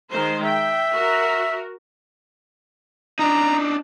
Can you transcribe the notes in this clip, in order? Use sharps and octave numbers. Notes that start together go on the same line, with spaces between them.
D#3 G#3 C5
E5 G5
F#4 A#4
D4 D#4 A#5